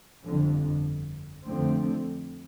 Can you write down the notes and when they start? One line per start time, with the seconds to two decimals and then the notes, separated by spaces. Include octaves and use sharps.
0.24 G1 F2 D3
1.45 F2 D3 F3 A3 C4